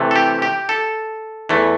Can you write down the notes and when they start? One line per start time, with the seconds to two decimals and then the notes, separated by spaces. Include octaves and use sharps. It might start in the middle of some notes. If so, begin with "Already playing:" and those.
Already playing: C3 E3 A3
0.11 A4
0.16 G4
0.42 G4
0.69 A4
1.49 E2 E3 A3